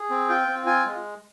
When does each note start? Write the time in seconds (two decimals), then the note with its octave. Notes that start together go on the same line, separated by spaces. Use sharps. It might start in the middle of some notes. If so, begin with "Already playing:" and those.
Already playing: G#4
0.10 C4
0.29 F4 G5
0.47 C4
0.66 F4 G#5
0.86 G#3